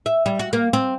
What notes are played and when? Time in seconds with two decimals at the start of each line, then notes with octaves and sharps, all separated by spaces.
0.06 E5
0.26 G3
0.39 F#4
0.53 A#3
0.73 C4